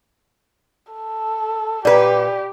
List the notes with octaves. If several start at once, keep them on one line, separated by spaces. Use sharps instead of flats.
A4
A#2 G4 B4 D5